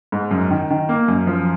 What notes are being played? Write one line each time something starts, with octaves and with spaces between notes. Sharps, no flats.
G#2
F#2
D#3
D#3
A#3
F#2
F3